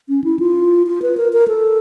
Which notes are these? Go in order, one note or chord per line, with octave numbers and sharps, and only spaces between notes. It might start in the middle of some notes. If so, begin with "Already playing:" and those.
C#4
E4
F4
F4
B4
A#4
A#4
A4